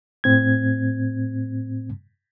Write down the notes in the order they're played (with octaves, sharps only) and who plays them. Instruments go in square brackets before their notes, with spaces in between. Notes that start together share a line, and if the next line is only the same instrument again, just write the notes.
[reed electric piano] A2 C4 G#6